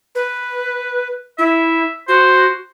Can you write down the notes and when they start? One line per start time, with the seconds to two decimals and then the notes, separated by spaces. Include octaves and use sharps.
0.15 B4
1.39 E4 E5
2.08 F#4 C5